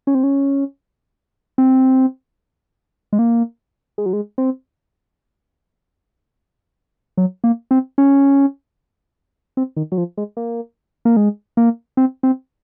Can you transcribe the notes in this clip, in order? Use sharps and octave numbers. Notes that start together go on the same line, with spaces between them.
C#4
C4
C#4
C4
G#3
A#3
G#3
F#3
G#3
C4
F#3
A#3
C4
C#4
C4
D#3
F#3
F3
G#3
A#3
A#3
G#3
A#3
C4
C4